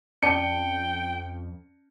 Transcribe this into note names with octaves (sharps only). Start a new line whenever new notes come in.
F2 C#4 D5 G5 A5 C#7